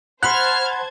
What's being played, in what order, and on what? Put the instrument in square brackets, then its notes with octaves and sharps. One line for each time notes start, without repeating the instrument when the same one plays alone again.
[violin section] C5 A5 G#6 [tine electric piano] F#5 B5 C6 [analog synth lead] F6 [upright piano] F#6